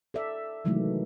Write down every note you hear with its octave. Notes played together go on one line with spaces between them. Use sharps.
A4 D5 E5
C3 D#3 E3 F#3 G#3 A3